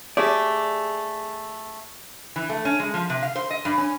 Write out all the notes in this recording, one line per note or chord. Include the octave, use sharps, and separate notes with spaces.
A3 G4 G#4 D5
E3
A3
C#4
G#3
F3
C3
F5
C5
D#5
G2
C#4